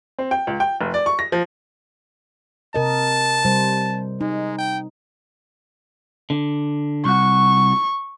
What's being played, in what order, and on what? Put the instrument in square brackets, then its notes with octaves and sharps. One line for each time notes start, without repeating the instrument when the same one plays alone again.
[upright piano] C4
G5
C#2
G5
F1
D5
C#6
A#6
F3
[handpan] C3 A#4 D#5 [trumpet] A5
[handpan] C3 G3 C5
[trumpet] G#3 [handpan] D#4
[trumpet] G5
[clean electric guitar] D3
[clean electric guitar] C2 F#4 [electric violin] C#6